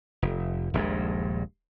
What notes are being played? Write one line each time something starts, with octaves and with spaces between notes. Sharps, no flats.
F1
D#1 A#1 G2 G#3